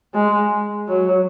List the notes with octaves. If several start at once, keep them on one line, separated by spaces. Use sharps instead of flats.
G#3
F#3